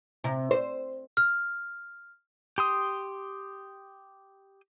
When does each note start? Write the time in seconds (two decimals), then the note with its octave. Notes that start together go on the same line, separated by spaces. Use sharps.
0.24 C3
0.51 C5
1.17 F6
2.58 G4 C6 D#6